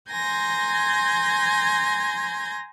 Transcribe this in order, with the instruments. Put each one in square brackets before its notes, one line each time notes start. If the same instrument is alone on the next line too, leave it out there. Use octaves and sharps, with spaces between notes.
[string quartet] G#5 A#5 C6 G6 G#6 A#6